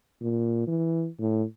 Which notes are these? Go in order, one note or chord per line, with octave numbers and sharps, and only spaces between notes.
A#2
E3
A2